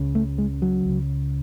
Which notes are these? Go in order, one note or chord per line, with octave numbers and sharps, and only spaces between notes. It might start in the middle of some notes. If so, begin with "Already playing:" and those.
Already playing: C#2 C#3
A3
G#3
F#3
C#2 C#3